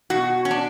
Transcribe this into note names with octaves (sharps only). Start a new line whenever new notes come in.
B2 F#4
C#4
D4